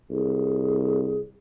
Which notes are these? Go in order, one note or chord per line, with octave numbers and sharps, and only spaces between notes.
C2 G#4